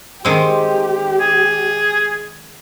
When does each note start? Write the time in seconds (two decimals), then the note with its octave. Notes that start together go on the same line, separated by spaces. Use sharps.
0.25 D#3 G#3 C4 G4
1.20 G#4